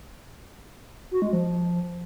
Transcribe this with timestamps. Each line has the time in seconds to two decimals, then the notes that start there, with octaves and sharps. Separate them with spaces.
1.11 F#4
1.22 G#3
1.33 F3